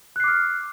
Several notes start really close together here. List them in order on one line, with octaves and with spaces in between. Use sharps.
F#6 C7 D6 F6